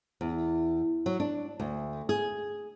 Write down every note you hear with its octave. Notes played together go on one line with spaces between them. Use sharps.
E2
F#3
D4
D2
G#4